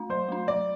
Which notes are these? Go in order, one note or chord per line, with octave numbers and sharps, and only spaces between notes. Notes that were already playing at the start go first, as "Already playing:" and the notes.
Already playing: A3 D4
F#3 C5
A3 D4
F#3 D5